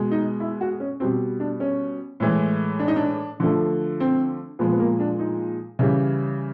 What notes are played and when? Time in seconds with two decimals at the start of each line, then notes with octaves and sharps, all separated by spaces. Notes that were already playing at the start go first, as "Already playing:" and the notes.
Already playing: B2 G#3
0.11 D#4
0.40 E4
0.61 F#4
0.80 C#4
1.00 B2 G3 C4
1.40 D4
1.60 C#4
2.20 A2 E3 G#3
2.80 D4
2.88 D#4
2.96 D4
3.40 D3 F3 A3
4.00 C4
4.59 A#2 F3 G#3 B3
4.72 B3
4.80 A#3
5.00 D4
5.19 D#4
5.79 C#3 E3 G3